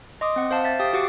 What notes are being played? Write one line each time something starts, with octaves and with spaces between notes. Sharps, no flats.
D#5 C6 D6 D#6
C4 F#5
C5 F5 A5
E5 A5 A6
G4 F5 G5 D#6 A6
F#4 G4 F#5 D6